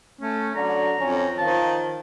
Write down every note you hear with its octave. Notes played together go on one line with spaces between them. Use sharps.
A3 C#4
D3 F#3 A#5
F2 C#4
D#3 F3 A5